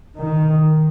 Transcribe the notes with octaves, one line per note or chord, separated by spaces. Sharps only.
D#3